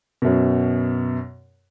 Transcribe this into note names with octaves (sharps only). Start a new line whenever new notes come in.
F#2 B2